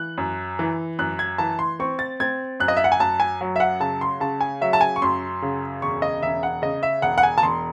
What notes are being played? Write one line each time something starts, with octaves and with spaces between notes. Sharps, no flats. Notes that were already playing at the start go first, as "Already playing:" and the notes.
Already playing: E3 F#6
F#2
E3
F#2 F#6
G#6
E3 A5
C6
C4 C#6
A6
C4 G#6
F#2 F#6
D#5
E5
F#5
G#5
F#2 A5
G#5
F#3
E5
F#5
C#3 A5
C6
C#3 A5
G#5
F#3 E5
A5
G#5
C#6
F#2 C6
C#3
E1 C#6
D#5
E1 E5
F#5
C#3 D#5
E5
E1 F#5
F#5
G#5
A5
E1 C6